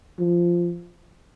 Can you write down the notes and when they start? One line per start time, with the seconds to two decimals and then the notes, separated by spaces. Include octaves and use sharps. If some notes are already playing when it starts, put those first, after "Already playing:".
0.19 F3